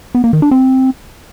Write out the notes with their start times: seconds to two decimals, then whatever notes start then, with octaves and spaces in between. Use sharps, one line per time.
0.15 B3
0.24 A#3
0.33 D#3
0.42 D4
0.51 C4